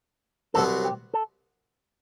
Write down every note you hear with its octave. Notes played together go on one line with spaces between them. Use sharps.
C2 C3 F#3 B3 A4
G4
A4